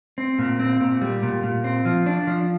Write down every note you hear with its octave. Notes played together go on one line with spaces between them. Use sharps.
C4
A#2
C4
A#2
G3
A#2
A#2
C4
F3
D4
F3